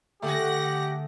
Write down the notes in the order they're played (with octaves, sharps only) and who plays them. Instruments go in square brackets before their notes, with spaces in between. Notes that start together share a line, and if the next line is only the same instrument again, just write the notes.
[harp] D3 [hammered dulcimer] A3 G#4 [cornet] G4 [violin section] F#5 A#6